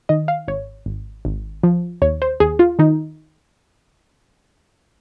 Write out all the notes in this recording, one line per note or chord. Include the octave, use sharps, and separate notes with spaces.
D#3 D#5
F5
G#1 C#5
G#1
G#1
F3
D#2 C#5
C5
D#2 G#4
F4
D#3 D#4